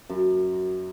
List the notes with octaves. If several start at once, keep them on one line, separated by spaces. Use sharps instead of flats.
F#2